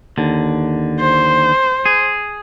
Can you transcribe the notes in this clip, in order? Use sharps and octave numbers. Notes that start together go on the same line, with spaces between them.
D#2 D3
C5
G#4